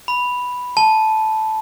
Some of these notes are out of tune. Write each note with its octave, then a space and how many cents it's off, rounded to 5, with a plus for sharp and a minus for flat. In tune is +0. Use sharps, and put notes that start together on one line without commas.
B5 +0
A5 -10